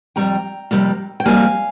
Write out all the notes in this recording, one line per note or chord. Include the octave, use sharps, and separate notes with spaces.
F2 C3 G3 A#3 G5 A#5
F2 C3 G3 A#3
G5
F2 C3 G3 A#3 F5 G#5